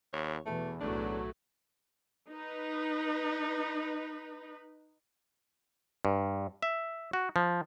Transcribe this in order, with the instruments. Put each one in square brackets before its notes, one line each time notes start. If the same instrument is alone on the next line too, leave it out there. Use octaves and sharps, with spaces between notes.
[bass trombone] D#2 [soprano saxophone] C#5
[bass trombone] E2 [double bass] B2 E3 [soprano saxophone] A3
[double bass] B1 A2 [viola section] F#3 A3 [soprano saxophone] D4
[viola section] D#4 B4
[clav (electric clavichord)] G2
E5
F#4
F3